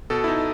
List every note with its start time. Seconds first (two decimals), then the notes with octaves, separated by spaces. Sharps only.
0.10 B2 A4
0.24 E4
0.28 D#4